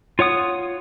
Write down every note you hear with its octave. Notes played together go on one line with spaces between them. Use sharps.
F4 C#5 F#5 D#6